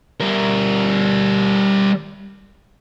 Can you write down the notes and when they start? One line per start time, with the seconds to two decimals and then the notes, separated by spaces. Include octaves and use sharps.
0.20 G3 A#4